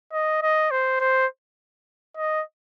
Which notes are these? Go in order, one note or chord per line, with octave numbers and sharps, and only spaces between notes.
D#5
D#5
C5
C5
D#5